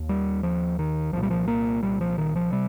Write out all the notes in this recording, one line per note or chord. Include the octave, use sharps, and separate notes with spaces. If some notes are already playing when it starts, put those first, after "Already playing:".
Already playing: D#2
G3
F3
D#3
C2 A#2 F3
G3
F3
A#3
G3
F3
D#3
F3
C3 G3